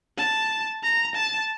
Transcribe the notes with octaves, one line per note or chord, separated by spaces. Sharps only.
A5
A#5
A5